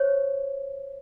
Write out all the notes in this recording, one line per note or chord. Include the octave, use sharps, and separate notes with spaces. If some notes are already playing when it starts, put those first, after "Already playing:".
Already playing: C5 C#5